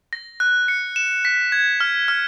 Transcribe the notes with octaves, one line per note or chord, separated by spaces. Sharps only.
A#6
F#6
C#7
E7
B6
G#6
F6
F6